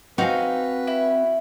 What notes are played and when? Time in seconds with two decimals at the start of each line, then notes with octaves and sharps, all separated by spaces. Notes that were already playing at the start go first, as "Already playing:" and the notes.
0.18 C4 D#4 F#4 B4 F5 G#5
0.87 E4